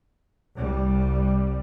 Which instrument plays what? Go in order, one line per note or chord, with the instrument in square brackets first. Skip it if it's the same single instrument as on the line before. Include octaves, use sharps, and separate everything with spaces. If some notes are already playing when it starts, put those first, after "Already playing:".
[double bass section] C2 G3